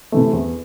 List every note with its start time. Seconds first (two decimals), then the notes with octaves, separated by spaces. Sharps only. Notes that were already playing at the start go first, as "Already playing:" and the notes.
0.12 C3 E3 A3
0.33 E2